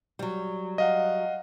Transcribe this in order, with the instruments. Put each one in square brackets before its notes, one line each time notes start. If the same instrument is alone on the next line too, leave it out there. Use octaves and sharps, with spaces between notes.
[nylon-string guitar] F#3 G3
[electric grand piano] D#5 F5 F#5